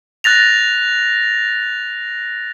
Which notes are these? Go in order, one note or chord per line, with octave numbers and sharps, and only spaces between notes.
F#6 A6 A#6 F7